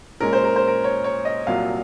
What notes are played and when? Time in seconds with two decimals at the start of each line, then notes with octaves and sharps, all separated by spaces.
0.20 A#2 G#3 C#4 A#4
0.33 C5
0.44 A#4
0.56 C5
0.67 A#4
0.84 C#5
1.04 C#5
1.25 D#5
1.47 C2 A#2 F#3 F5